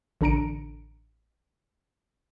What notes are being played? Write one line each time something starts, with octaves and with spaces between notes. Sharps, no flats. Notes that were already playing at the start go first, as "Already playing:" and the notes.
A1 D3 D4 A#5 C#7 D7